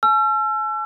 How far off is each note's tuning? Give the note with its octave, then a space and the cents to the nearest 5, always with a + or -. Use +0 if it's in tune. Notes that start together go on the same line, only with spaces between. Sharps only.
G#5 +45 E6 +40